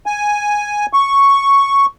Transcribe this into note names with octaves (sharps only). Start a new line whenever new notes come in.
G#5
C#6